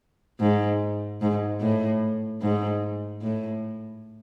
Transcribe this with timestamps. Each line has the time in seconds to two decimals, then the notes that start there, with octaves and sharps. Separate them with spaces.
0.40 G#2
1.22 G#2
1.61 A2
2.42 G#2
3.22 A2